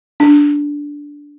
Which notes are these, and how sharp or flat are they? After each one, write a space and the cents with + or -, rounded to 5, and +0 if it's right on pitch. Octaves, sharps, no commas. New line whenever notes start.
D4 -10